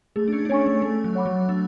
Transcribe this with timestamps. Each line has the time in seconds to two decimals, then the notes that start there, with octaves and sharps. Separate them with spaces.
0.16 A3 G#4
0.28 D4
0.33 C#4
0.45 D4
0.50 C#4 C#5 G#5 C#6
0.66 A3
0.82 A3 A4
1.04 F#3
1.15 C#5 F#5 B5 D6
1.26 F#3
1.48 A3 D4